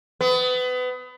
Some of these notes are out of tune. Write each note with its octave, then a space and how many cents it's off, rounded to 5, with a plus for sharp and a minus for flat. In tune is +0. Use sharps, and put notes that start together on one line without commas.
B3 +30